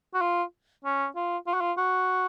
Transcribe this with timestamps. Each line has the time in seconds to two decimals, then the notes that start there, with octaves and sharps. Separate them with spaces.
0.14 F#4
0.21 F4
0.85 C#4
1.16 F4
1.47 F4
1.54 F#4
1.61 F4
1.77 F#4